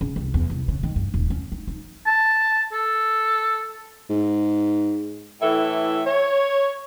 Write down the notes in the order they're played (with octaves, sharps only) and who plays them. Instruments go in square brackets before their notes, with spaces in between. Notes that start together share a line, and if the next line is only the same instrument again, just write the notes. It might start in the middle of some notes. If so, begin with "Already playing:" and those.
[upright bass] C#3
C2
E2
C2
C#3
D#3
G2
D#1
C#4
D#4
D#4
[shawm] A5
A4
[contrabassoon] G#2
[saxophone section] A2 E3 A4 E5
C#5